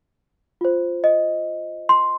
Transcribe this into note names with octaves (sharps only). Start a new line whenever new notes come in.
F4 C5
D#5
C6